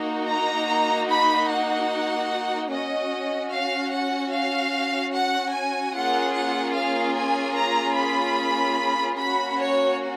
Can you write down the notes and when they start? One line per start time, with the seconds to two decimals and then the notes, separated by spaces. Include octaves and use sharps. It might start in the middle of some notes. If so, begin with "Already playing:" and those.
Already playing: A#3 D#4 F#4
0.28 A#5
1.10 B5
1.50 F#5
2.71 C#4 F#4 D#5
3.52 F5
3.93 F#5
4.33 F5
5.14 F#5
5.54 G#5
5.94 A#3 C#4 F4 G#4 F#5
6.35 F#5
6.75 F5
7.16 G#5
7.56 A#5
7.97 B5
9.17 A#3 C#4 F#4 B5
9.58 C#5